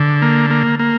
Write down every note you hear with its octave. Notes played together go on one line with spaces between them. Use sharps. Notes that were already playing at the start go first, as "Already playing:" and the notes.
Already playing: D3
A#3
A#3
A#3